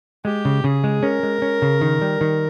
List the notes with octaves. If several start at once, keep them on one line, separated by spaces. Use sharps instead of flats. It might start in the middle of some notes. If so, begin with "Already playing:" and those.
G#3 G4
C#3
C#3 G#4
G#3
C#4 A#4
G#3
C#4
C#3
D#3
G3
D#3